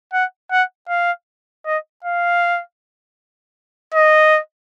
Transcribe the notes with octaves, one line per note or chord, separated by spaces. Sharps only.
F#5
F#5
F5
D#5
F5
D#5